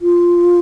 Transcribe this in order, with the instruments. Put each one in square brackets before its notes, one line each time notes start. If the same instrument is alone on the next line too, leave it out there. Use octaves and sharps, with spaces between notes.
[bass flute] F4